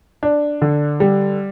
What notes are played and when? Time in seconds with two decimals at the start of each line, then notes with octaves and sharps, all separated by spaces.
0.23 D4
0.62 D3
1.00 G3